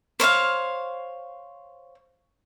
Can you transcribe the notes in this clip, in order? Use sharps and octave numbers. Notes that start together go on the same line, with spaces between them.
C5 C#5 D#5 F5